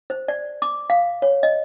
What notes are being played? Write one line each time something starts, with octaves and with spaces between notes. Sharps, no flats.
C5
D5
D6
F5
C#5
D#5